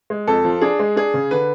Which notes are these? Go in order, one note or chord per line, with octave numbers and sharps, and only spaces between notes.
G#3
F2 A4
F3
D4 G#4
G#3
D4 G#4
C#3
D3 B4